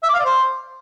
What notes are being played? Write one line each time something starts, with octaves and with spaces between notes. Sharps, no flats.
E5
D6
F5
D5
C5